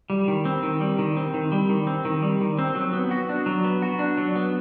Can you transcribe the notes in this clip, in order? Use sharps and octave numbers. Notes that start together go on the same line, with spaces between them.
G3
D#3
C4
D#3
G3
D#3
C4
D#3
G3
D#3
C4
D#3
G3
D#3
C4
F#3
B3
F#4
D4
F#3
B3
F#4
D4
F#3
B3